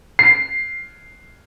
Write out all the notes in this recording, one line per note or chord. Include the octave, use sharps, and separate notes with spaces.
C7